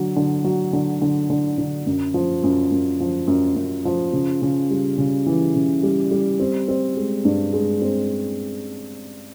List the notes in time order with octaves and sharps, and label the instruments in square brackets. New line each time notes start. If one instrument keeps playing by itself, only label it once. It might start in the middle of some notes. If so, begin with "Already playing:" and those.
Already playing: [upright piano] D3 F#3
D3
F#3
D3
D3
D3
D3
F#2
F3
F#2
F#2
F3
F#2
F#2
F3
C#3
C#3
G3
C#3
E3
C#3
G3
G3
C4
C4
G#3
G2
G#3
C4